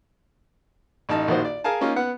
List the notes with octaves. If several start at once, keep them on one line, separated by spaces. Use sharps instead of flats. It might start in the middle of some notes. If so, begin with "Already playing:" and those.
A1 D#4 A5
A#1 D#3 F#4 C5
D5
G#4 A#4 F5 G#5 A5
A#3 C#4 D#4 F4
B3 F#5